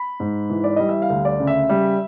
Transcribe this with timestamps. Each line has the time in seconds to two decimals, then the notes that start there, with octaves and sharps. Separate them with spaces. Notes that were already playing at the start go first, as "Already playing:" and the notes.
Already playing: B5
0.20 G#2
0.50 E3
0.64 D5
0.76 G3 D#5
0.89 E5
1.02 F5
1.10 D2
1.25 D5
1.40 C#3
1.47 E5
1.69 G3